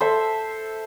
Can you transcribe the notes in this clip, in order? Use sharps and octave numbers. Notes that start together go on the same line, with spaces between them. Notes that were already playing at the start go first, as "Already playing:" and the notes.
A4 C5 E5